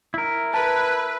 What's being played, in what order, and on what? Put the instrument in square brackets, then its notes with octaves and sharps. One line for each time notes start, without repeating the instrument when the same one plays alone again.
[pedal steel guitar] E4 A#4
[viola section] B4 [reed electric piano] A5